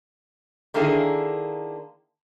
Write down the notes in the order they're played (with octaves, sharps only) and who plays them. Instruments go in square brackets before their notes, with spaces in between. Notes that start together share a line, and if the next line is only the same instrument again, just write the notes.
[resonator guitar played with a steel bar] D3 D#3 A#3 D4 E4 G#4